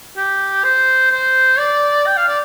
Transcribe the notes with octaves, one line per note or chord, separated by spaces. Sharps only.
G4
C5
C5
D5
G5
F5
D5